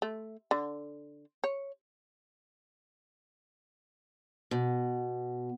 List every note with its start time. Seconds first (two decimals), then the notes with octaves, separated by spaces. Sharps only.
0.02 A3
0.51 D3
1.44 C#5
4.51 B2